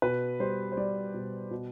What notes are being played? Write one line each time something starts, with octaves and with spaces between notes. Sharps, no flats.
B2 B4
G3 C5
C5
G3 D5
B2
B2